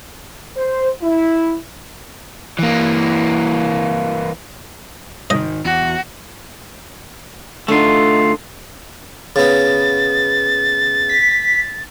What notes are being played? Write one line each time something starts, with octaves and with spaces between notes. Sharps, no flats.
C5
E4
E3 A#3
G#2 D#3 D#5
E2 F#4
D3 A3 D4 D#4 F4
C#3 B3 A6
B6